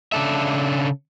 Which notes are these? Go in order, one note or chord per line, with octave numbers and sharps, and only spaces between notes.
C#3 D4 A4 E5